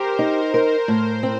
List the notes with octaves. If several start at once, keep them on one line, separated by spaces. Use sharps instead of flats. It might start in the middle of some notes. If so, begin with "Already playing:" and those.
Already playing: G4 A#4 C5
D#4
A#4 C5
A2 C5
C4